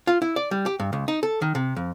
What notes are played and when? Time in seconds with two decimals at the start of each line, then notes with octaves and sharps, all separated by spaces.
0.07 F4
0.22 E4
0.36 D5
0.51 G3
0.66 G4
0.80 G2
0.93 C#2
1.08 D#4
1.23 A4
1.42 D#3
1.55 C3
1.76 F2